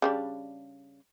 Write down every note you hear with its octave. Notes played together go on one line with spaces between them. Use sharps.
C#3 G3 D4